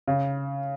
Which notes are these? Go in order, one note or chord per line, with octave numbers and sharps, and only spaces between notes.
C#3